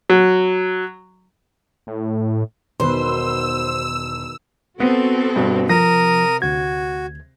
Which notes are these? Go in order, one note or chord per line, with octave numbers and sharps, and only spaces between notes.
F#3
A2
E1 B2 D#3 B4 C5 C6 E6
B3 C4 F#4 A4
G2 B2
C3 F3 A#4 D#6 A#6
D2 F#4 G#6